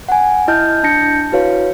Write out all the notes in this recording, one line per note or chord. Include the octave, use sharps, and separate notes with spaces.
F#5 G#5
E4 D#5 A5 F6 G6
D4 A5 G6 A#6 C#7
E4 F#4 B4 C#5 F5